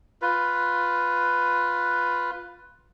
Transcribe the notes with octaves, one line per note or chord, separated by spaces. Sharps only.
F4 B4